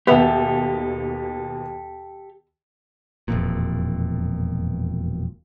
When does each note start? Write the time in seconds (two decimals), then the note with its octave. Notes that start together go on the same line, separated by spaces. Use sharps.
0.07 D#2 B2 D#3 B3 G4 A4 E5 F#5
3.28 E1 F2 A#2